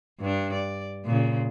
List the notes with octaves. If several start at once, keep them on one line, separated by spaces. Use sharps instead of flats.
G2 D4
D5
A#2 C#3